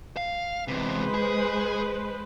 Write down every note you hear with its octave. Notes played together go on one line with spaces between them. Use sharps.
F5
E2 C3 G#3 B4 C5
G#4